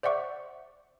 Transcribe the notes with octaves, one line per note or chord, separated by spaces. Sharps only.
C5 D5 E5 F#5 C#6 D6